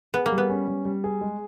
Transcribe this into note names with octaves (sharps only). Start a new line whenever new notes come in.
B3 G#4
A#3
G3
B3
C#4
G3
G3
G#4
G#3